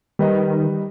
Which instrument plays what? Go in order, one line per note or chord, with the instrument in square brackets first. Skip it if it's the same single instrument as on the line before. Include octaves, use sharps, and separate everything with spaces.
[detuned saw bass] D#3 [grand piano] G3 B4 D#5